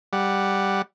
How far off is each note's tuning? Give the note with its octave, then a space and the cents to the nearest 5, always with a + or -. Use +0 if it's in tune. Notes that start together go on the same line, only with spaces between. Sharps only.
G3 +0 F#5 +0